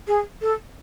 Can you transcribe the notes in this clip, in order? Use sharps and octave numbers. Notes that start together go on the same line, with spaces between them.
G#4
A4